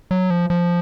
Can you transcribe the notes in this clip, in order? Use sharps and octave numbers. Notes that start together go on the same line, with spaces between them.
F#3
F3
F3